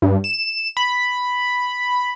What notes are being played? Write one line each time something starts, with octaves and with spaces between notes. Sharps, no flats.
G2
E7
B5